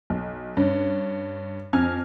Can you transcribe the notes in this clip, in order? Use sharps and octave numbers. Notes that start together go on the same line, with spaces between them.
B1
G2 C#4
F2 G#5 F6 G#6